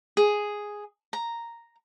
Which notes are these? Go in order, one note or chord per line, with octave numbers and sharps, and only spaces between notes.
G#4
A#5